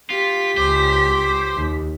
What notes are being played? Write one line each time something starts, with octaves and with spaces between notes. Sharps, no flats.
F4 G4 B6
C#2 C5 D6
D#2